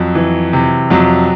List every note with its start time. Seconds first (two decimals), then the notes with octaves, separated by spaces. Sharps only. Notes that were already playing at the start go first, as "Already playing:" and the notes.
Already playing: F2 F#3
0.15 E3
0.53 C3
0.90 F2 F#3